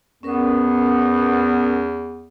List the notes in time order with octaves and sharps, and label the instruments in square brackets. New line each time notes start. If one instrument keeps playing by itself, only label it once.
[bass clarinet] E2 [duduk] B3 [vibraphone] C#4 A#4 B4